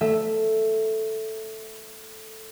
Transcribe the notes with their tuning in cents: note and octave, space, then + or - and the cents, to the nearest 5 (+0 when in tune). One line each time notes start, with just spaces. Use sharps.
A3 +0 E5 +0